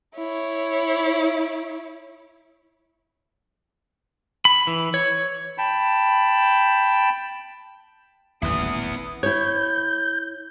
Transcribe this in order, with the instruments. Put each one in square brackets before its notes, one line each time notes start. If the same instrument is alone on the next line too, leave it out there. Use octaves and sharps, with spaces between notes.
[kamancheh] E4 C#5
[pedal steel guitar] B5
E3
C#5
[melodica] G5 A5 B5
[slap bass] D#1 A1 D3 [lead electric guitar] B3 E4 [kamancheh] D#6
[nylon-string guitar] E4 C#5 [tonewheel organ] G6